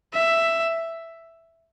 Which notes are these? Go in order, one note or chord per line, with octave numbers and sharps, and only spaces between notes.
E5